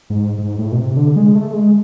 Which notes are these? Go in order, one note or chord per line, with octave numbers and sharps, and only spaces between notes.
G#2
G#2
A2
B2
C3
D3
G#3
A3
G#3